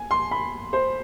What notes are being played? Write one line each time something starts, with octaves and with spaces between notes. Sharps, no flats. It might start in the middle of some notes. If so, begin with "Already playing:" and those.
Already playing: G#5
C6
B5
C5